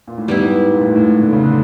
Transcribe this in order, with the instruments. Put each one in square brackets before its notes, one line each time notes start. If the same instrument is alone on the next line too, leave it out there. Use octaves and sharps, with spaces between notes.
[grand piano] A#2
A2
[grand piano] G#2 [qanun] G3 B3 E4
[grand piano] A#2
A2
G#2
A2
D3
C#3
D3